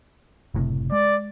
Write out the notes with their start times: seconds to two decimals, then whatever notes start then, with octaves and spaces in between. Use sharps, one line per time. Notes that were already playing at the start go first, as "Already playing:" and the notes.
0.55 F#1 A2 C3
0.92 G#3 D5